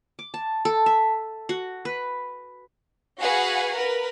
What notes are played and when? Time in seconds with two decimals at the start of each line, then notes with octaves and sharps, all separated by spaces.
0.19 D6
0.34 A5
0.65 A4
0.86 E5
1.49 F#4
1.85 B4
3.20 F#4 G#4 B4 F5 F#5 G#5
3.73 A#4 B4